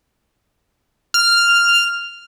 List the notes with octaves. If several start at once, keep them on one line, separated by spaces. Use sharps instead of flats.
F6